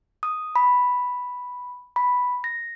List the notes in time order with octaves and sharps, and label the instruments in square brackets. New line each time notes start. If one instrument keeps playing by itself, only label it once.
[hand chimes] D#6
B5
B5
A#6